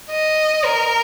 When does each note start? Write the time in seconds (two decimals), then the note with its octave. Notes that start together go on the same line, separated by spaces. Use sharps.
0.11 D#5
0.65 A#4